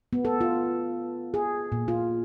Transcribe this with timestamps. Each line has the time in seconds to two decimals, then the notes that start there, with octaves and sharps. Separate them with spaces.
0.13 B3
0.25 A4
0.41 F4
1.34 G#4
1.72 A#2
1.88 F4